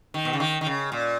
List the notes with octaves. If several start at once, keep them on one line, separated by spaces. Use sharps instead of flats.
D#3
B2
C#3
D#3
D#3
C#3
A#2